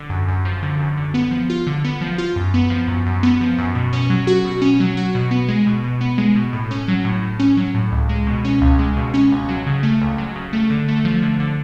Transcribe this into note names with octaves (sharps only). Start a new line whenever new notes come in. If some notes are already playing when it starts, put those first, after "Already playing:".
Already playing: D3
F#2
F#2
F3
D3
F#2
D3
B3
F3
F4
D3
B3
F3
F4
F#2
B3
F3
F#2
F#2
B3
F3
F#2
B2
C#4
F#3
F#4
B2
C#4
F#3
F#4
B2
B3
G#3
B2
B2
B3
G#3
B2
A2
C#4
F#3
A2
A2
C#4
F#3
A2
C#2
G#3
B2
C#4
C#2
G#3
B2
C#4
C#2
F#3
C#3
A3
C#2
F#3
C#3
A3
D3
A3
F3
D3
D3